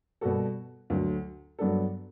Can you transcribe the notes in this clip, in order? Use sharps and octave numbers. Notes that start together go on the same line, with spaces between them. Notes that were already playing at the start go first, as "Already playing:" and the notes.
B2 G3 B3 F#4 A4
D2 D3 F#3
G2 F#3 B3 D4 A4